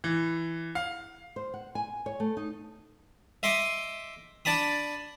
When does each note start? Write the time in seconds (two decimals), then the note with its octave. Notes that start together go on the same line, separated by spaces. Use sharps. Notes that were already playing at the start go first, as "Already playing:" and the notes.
0.04 E3
0.75 F5
1.36 C5
1.54 F#5
1.75 G#5
2.06 C#5
2.20 A3
2.37 D#4
3.43 D#5 E5 C6 D6 D#6
4.45 D4 D5 A5 B5 D#6